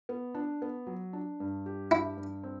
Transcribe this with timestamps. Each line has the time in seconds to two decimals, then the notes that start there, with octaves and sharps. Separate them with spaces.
0.09 B3
0.34 D4
0.62 B3
0.87 F#3
1.13 D4
1.40 G2
1.66 G4
1.91 G2 E4
2.17 G2
2.43 C4